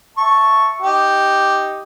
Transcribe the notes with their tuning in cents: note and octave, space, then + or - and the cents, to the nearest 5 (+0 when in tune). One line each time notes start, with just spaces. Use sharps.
E5 +0 A5 +0 C#6 +0
D#4 +0 G4 +0